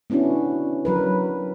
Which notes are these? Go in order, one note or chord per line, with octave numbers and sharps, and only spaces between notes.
B3 C#4 D4 E4 F#4
F#3 A#4 B4